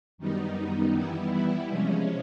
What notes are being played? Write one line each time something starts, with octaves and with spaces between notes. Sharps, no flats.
F#2 D#3 G3 B3 D#4
E3 G3 B3 E4
C3 F3 G#3 C#4